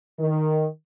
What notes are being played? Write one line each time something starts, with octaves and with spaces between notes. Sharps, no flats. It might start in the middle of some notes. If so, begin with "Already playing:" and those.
D#3